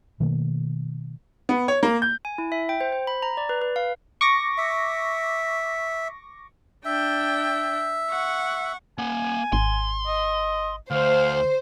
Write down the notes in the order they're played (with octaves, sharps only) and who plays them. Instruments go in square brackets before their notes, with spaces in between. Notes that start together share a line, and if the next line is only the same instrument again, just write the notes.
[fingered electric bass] B2 D#3 A3 A#3
[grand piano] B3
C#5
A#3
G6
[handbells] G#5
E4
E5
G5
C5
C5
B5
A#5
D5
B4
B4
F5
[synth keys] C#6 D6 A#6
[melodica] E5
[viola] D4 G5 [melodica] E5
[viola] F#5 C#6
[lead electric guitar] A#3 F#5 [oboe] G#5
[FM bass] G#1 [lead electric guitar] C6
[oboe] D#5
[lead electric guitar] D2 [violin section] C5 [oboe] F5